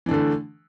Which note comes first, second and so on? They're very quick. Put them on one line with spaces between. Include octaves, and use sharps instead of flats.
E3 D4 D3 A3